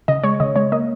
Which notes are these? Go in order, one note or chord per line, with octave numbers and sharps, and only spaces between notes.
C#3 D#5
G#3 C#5
C#3 D#5
G#3 C#5
A#3 D#5